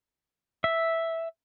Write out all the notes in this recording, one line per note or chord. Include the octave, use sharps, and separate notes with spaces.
E5